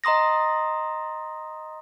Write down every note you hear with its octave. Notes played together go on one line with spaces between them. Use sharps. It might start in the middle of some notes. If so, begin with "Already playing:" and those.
D#5 A#5 C6 D#6 A#6